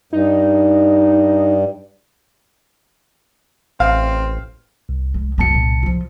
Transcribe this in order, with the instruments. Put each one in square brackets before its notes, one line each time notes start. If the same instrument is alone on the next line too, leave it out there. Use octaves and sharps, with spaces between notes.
[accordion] G2 [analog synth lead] D#4
[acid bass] A1 [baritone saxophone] C4 [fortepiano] F5
[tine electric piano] C2
[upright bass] G#3
[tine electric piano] C2 A5 C#7 [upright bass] F#2 A#3
[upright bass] A#2 B3
F3 F4